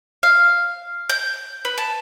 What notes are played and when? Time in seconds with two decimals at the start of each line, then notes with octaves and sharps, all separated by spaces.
0.23 F5
1.09 G6
1.65 B4
1.78 A5